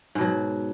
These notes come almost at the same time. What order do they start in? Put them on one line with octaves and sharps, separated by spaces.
G#2 B2 F#3